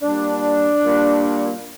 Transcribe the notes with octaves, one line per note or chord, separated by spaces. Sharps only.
A#2 G3 D4
A#2 G3